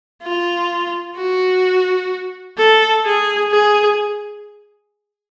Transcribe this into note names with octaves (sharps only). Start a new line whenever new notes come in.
F4
F#4
A4
G#4
G#4